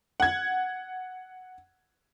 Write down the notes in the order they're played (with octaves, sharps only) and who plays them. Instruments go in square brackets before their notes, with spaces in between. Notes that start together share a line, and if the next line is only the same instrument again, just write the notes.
[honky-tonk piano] F#5 G#6